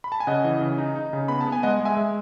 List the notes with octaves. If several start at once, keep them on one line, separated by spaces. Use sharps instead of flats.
B5
A5
G#5
C#3 D#5 F#5
E3
C#3
D#4
D#4
C#3
B3 B5
A5
B3
G#5
G#3 D#5 F#5
G#3
E5 G#5
G#3